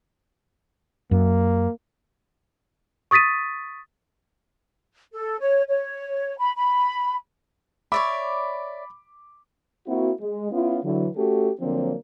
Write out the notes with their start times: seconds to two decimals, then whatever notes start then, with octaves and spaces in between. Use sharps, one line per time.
1.11 F#2 A#3
3.11 C#6 D#6 A6 B6 D#7
5.13 A4
5.40 C#5
5.69 C#5
6.39 B5
6.56 B5
7.92 C#5 D5 E5 B5 D6
9.87 A#3 C4 E4 F#4
10.20 G#3
10.52 B3 C#4 E4 F4
10.84 D3 E3 F#3
11.16 A3 C#4 F#4 G4 A4
11.60 D3 F3 F#3 A#3 C4 D4